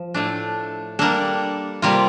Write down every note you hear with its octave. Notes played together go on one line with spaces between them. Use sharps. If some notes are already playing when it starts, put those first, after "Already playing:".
Already playing: F3
A2 A3 D4
G3 A#3 D4 A4
C3 G3 A#3 F4